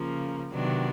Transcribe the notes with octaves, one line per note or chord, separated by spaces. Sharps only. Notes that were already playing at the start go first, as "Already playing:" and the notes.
Already playing: C#3 F3 A#3
C3 D#3 F#3 B3 D4